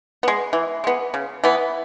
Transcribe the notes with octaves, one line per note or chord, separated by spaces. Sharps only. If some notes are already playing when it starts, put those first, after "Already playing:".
G#3 B3
E3
G#3 B3
C#3
E3 B3